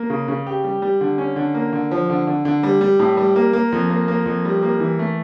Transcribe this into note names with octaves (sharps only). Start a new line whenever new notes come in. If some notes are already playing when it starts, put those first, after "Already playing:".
Already playing: A#3
C#3
C#3
G4
G3
G3
D3
C#4
D3
A#3
D3
F3
D3
D3
D3
G3
G3
A2
G3
A#3
A#3
F2
A#3
A#3
F2
G3
A#3
E3
A3